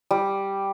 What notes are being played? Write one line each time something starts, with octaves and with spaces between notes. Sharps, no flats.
G3